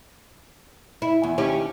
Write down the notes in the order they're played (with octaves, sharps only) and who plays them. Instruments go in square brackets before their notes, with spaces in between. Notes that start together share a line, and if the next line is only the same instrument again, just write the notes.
[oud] E4
E2
D#2 C#4 G4